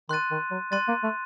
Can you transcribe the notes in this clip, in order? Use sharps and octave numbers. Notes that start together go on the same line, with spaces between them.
D#3 C6 F#6 A6 D#7
D#3
F#3
G3 C6 F#6 A6 D#7
A#3
A3